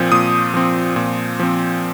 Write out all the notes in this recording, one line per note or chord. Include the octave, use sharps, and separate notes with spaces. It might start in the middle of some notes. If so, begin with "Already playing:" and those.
Already playing: A#2 F3 C4
A#2 D#6
F3 C4
A#2
F3 C4